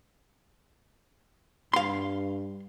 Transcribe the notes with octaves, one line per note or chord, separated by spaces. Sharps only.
G2 F5 C6